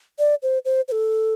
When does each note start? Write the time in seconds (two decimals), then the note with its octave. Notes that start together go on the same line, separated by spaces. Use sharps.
0.19 D5
0.43 C5
0.65 C5
0.88 C5
0.92 A4